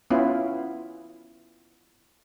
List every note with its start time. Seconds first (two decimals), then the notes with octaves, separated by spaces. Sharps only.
0.10 B3 C#4 E4 F4